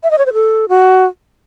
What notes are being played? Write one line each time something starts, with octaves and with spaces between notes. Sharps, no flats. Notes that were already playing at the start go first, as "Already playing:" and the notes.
E5
D#5
C#5
C5
A4
F#4